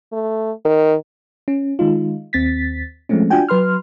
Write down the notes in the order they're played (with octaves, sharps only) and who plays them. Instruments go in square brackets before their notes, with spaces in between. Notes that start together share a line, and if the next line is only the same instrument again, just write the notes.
[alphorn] A3
D#3
[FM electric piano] C#4
D#3 G#3 D#4 F4
D#2 C4 A6 B6
F3 G#3 A3 C4 C#4
D4 F4 F#4 G5 G#5
F#3 B4 C6 F6